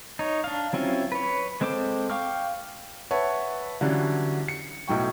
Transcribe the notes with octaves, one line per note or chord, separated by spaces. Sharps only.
D#4 C#5
D4 F5
F#3 C4 C#4 E4 F4
B4 C#5
G#3 C4 A4 C5 D6
F5 G5 C#6 D6 F6
B4 C#5 E5 F#5 A5
D3 E3 F#3 G3 C#4 D4
C#7
B1 A2 F#3 G5 C#6